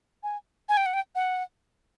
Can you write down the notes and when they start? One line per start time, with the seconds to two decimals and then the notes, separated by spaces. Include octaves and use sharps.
0.23 G#5
0.69 G#5
0.77 G5
0.86 F#5
0.94 G5
1.15 F#5